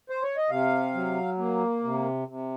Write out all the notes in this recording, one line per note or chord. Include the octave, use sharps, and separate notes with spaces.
C5
C#5
D#5
C3 F5
F#3
A#3
C3
C3